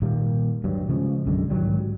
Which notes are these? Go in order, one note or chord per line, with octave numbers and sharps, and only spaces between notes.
A#2 D#3 G3 A#3
D1 G2 F#3
C#3 F3 G#3
B1 F#2 D3 G#3
G#2 D#3 F#3 G3